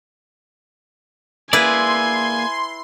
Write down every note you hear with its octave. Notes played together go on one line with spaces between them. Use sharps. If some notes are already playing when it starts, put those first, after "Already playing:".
A#3 E4 G#4 B4 D5 G#5 C6